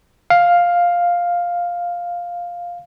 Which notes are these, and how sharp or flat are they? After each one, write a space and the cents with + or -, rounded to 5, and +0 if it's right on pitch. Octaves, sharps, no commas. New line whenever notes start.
F5 +5